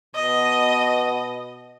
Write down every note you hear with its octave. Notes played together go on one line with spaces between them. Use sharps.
B2 D#5